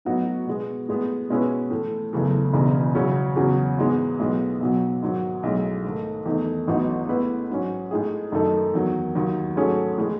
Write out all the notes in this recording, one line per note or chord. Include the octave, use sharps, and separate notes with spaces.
A2 F#3 B3 D#4 F#4
B2 G#3 B3
A2 G#3 B3
B2 G#3 C#4 E4 B4
A2 E3 A3
F#1 E2 C#3 E3 A3
E1 E2 C#3
C#3 F#3 C#4 E4
E2 C#3 F#3 C#4 F#4
G#2 E3 G#3 B3
B1 A2 G#3 B3
B1 B2 F#3
G#2 D#3 F#3
B1 A2 G#3
G#2 D#3 A3
E2 D#3 A3 D#4
A1 A2 F#3 B3 D#4
A2 G#3 B3 E4 B4
G#2 F#3 C#4
A2 G#3 D#4 G#4
F#2 D#3 A3 D#4 A4
E2 D#3 F#3
D#2 D#3 F#3
G#2 F#3 A3 C#4 G#4
A2 E3 G#3